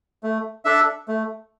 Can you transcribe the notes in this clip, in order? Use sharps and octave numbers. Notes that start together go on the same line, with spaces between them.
A3
D4 A4 E5
A3